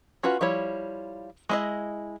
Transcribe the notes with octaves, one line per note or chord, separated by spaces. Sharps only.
C#4 F4 F#4 B4
F3 G3 E4 C#5
G#3 E4 D#5